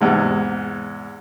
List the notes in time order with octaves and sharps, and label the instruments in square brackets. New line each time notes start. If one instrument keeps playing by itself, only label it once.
[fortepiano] E2 G#2 C3